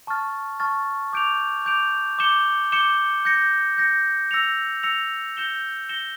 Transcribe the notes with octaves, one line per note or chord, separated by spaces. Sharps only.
A5 C#6 F6 A6
A5 C#6 F6 A6
D6 G6 D7 F7
D6 G6 D7 F7
D6 G6 C#7 E7 G7
D6 G6 C#7 E7 G7
G6 A#6 C#7
G6 A#6 C#7
E6 A#6 C#7 F7
E6 A#6 C#7 F7
G6 A#6 C#7 E7 G7
G6 A#6 C#7 E7 G7